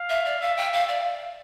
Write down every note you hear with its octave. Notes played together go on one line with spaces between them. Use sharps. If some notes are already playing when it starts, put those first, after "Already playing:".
Already playing: F5
E5
D5
E5 F5
G5
F5
D5